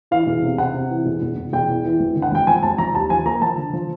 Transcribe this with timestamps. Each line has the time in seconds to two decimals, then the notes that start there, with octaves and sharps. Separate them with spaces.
0.11 E3 F5
0.27 E1
0.43 C3
0.58 C3 F#5
0.74 C3
0.90 E3
1.06 E1
1.22 E1
1.37 E1
1.53 E1 G5
1.68 E3
1.84 E3
2.00 G#1
2.16 D3
2.22 F#5
2.32 G#1 G5
2.47 F3 G#5
2.63 G#1 A5
2.78 F3 A#5
2.94 D#2 A5
3.10 F3 G#5
3.26 A#3 A#5
3.42 F3 A5
3.58 D3
3.73 F3